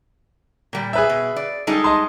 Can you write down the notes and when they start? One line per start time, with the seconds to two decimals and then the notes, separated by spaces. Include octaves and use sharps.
0.73 A#2 G3
0.93 G#4 B4 E5
1.10 B2
1.36 D5
1.67 G3 G#3 D#4 A4
1.84 D#5 A5 C6